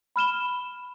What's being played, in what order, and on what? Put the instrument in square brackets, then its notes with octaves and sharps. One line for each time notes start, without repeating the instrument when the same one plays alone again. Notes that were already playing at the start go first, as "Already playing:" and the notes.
[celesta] B5 F6 E7 G7